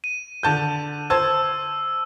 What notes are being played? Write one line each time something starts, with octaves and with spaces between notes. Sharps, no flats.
D#7
D3 A5 G6
C5 A5 E6 G#6